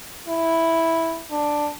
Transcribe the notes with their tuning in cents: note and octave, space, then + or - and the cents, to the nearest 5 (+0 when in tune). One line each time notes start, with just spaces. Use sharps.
E4 -5
D4 +5